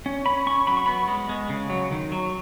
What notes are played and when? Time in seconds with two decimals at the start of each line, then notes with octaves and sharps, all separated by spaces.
0.06 C#4
0.25 C#4 B5
0.47 C#4 C#6
0.67 F#3 B5
0.77 C#6
0.86 B3 B5
1.08 G#3
1.29 G#3
1.50 C#3
1.70 F#3
1.91 D#3
2.12 F#3